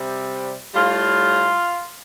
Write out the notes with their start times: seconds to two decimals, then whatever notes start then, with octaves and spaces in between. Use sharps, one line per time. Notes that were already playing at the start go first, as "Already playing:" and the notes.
Already playing: C3 G3
0.74 A2 G3 F4